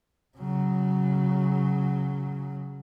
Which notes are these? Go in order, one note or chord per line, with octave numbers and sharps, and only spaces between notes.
C#3 F#3